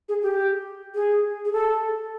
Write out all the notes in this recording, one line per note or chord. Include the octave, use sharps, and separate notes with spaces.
G#4
G4
G#4
G#4
A4